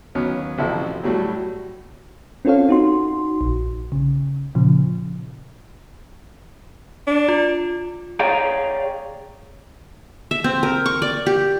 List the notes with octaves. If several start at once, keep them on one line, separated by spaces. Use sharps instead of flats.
D#2 F#3 B3 C#4 F6
A1 C3 F3 E4 F#4 A4
A2 F#3 G3 F#4 A4
C4 C#4 F4 A4 C#5 F5
D#4 F#4 C6
A#1
C#3
A#2 C#3 F3
D4
F4
G#4 C#5 D5 F5 G5 A#5
E5
C4
A#4
C#6
D5
G4